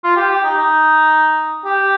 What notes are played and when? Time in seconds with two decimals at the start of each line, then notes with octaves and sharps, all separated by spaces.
0.04 F4
0.16 G4
0.31 G4
0.44 D#4
0.58 D#4
1.65 G4